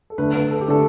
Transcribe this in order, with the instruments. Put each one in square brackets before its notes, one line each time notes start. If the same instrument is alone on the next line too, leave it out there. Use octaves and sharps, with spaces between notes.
[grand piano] A4
[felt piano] D3 A3 D4 [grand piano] B4
[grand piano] B4
A4
G4
[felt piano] D3 A3 D4 [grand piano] A4